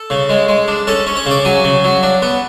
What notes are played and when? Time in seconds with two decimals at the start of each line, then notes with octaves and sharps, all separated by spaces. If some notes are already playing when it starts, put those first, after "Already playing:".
Already playing: A4
0.10 C#3
0.29 G#3
0.48 G#3
0.68 D4
0.87 C#4 A4
1.07 C#4
1.16 C#5
1.26 C#3 D5
1.45 F#3 G#5
1.64 C#3
1.84 F#3
2.03 D4
2.22 B3